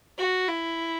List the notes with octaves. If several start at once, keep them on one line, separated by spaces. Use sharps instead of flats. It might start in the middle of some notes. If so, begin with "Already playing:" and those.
F#4
E4